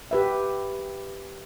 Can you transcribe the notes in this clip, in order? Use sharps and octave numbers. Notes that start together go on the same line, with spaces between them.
G4 B4 E5